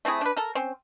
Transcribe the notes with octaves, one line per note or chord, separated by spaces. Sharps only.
A3 C4 E4 G#4
D4 B4
A4 A#4
C4 C#4